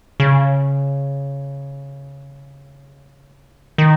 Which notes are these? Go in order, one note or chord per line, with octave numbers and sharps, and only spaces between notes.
C#3
D#3